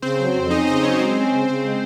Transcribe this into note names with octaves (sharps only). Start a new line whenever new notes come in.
C#3 C4 C5
F#3
F2
C#4 D#4 D#5
C#3 D#4 D#5
F#3 C#4 C#5
G#3 C4 C5
C#4
C#3
C#3 C4 C5
G#3